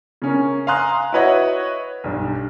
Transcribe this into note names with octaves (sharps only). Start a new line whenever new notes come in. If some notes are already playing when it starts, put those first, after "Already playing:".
C#3 C#4 A#4
F5 G#5 A#5 C6 D#6 F#6
E4 F#4 B4 C#5 D#5 F#5
B1 G2